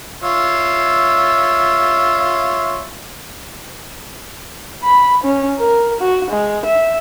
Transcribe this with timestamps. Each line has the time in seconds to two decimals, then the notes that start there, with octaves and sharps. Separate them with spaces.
0.23 F4 C#5 E5
4.84 B5
5.24 C#4
5.59 A#4
6.00 F#4
6.30 G#3
6.66 E5